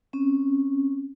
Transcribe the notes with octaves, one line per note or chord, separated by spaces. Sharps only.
C4 C#4